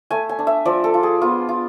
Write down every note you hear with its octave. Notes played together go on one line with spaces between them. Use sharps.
A3 G#5
G#5
D4
E5
F3 D5
A4
F4
G#4
B3 F4
F4